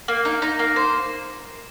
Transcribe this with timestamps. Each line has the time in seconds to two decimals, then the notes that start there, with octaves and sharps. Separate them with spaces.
0.08 A#3
0.25 D#4
0.42 D#4
0.59 A#3
0.76 C5